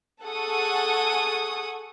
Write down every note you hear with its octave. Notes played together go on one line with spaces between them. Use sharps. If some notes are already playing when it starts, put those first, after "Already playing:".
G#4 A4 F#5 C#6 D#6